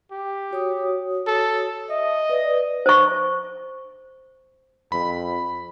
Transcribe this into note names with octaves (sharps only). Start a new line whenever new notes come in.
G4
F#4 C#5 D#6
A4
D#5 E5
B4 D5
C5 C#6
F2 B5